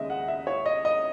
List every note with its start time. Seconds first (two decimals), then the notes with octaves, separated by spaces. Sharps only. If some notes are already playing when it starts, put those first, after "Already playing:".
Already playing: D#2 C#3 G#3 D#5 E5
0.10 F#5
0.28 E5
0.47 C#5
0.66 D#5
0.85 D#5